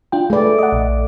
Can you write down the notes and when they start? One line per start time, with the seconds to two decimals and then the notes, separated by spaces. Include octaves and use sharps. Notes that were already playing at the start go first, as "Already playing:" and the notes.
0.12 D4 F4 G5
0.30 A3 G#4 B4 D5
0.59 D#5 F#5
0.72 A#1